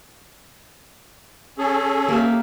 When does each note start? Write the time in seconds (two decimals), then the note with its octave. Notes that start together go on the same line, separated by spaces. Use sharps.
1.58 C#4 G#4 A4
2.08 A#3 G4 E5